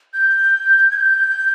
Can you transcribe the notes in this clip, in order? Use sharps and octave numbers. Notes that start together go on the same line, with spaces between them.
G6
G#6
G6